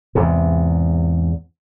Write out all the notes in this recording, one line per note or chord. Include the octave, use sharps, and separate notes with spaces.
E2 G#2 C3